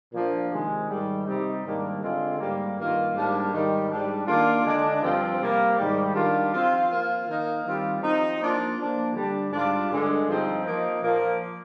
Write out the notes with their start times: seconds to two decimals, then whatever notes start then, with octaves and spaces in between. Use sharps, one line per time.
0.13 A#2 F3 A#3 D4 F4
0.52 C3 D#3 G#3
0.89 G#2 D#3 G3
1.26 C3 G3 C4 D#4
1.63 G#2 D#3 G3 A#3 D4
2.01 D3 G#3 C4 F4
2.38 G#2 G3 A#3
2.76 G2 D#3 A#3 F4
3.13 G#2 G3 A#3 D4
3.52 G#2 D#3 G3
3.90 G#2 G3 D4
4.26 D#3 A#3 D4 F4
4.65 D3 G#3 D4
5.01 G2 F3 C4 F4
5.39 C3 G3 A#3
5.77 G#2 D#3 G3
6.14 D#3 G3 D4 F4
6.52 F3 C4 F4
6.89 F3 A#3 F4
7.27 D#3 A#3 D#4
7.65 D#3 G3 C4 F4
8.02 F3 C4 D#4
8.39 F3 A#3 D4 F4
8.77 F3 A#3 D4
9.14 D3 G3 D4
9.52 G#2 G3 D4 F4
9.89 G2 D3 G#3
10.27 G2 F3 C4 D#4
10.65 F3 A#3 D#4
11.03 A#2 F3 A#3